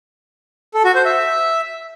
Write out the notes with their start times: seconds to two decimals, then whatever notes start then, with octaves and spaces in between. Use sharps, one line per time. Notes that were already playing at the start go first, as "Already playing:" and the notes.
0.74 A4
0.85 F#4
0.95 C5
1.05 E5